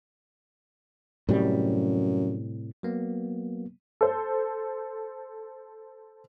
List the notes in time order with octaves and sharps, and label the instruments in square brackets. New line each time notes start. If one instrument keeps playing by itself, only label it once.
[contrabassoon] F#2 [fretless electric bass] A2 C3 G3
[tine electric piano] F#3 A#3 B3
[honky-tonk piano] A4 C5